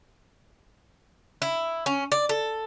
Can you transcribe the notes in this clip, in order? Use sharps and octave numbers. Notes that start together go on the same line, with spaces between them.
E4
C#4
D5
A4